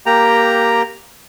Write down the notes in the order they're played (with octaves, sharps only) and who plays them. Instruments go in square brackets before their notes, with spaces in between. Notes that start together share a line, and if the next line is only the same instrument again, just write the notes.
[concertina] A#3 G4 G5 [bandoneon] A#5